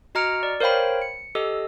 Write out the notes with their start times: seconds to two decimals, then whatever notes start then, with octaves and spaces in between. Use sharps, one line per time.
0.15 F#4 D#5 A#5 F6 C#7 D7
0.43 D5
0.60 A#4 C5 C#5 F5 G5 B5
1.02 C#7
1.35 G4 A4 D#5 E6